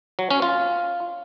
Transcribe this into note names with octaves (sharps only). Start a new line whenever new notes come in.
F#3
C#4
F4